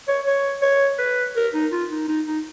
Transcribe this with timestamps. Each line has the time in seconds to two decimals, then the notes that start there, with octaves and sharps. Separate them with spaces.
0.08 C#5
0.27 C#5
0.62 C#5
0.99 B4
1.36 A#4
1.54 D#4
1.72 F4
1.91 D#4
2.08 D#4
2.27 D#4